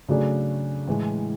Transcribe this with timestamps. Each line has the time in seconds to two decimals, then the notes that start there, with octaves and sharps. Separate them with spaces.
0.09 C#3 F#3 A3 D4 G#4
0.88 A2 E3 G#3